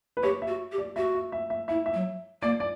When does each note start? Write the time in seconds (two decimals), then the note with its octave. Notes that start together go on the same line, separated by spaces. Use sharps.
0.17 B4
0.23 G4 C#5
0.42 E5
0.48 F#4
0.72 G4
0.78 D5
0.96 F#4 E5
1.14 E5
1.32 E5
1.50 E5
1.68 E4 E5
1.86 E5
1.94 F#3
2.42 A#3 D5
2.60 D5